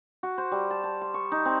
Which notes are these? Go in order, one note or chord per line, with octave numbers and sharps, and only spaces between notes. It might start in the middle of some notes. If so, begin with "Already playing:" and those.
F#4
C5
G3
A5
A5
C6
C#6
D#4
C4